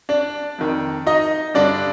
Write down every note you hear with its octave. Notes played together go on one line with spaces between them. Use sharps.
D4 D5
F2 D#3
D#4 D#5
G2 D3 D4 D5